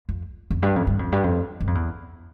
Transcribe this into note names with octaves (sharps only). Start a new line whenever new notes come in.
F2
F2
G2
F2
G2
F2
G2
F2
G2
F2
E2